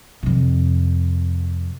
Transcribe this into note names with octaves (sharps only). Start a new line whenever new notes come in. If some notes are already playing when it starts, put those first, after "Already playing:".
F2 C3